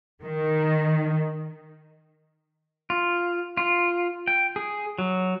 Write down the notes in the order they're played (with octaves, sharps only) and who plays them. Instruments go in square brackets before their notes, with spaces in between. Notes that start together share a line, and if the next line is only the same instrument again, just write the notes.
[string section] D#3
[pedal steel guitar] F4
F4
G5
G#4
F#3